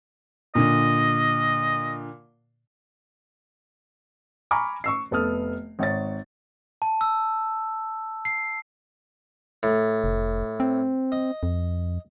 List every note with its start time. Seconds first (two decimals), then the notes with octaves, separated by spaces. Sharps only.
0.55 A#2 D3 D#5
4.51 G#5 A#5 B5 C#6 D6 F6
4.84 C#6 E6 C7
5.11 F1 B3 A4 D#6 F6
5.79 G#1 C#5 A6
6.82 A5
7.01 E6
8.25 C7
9.63 A2
10.04 F1
10.60 C4
11.12 D#5
11.43 F2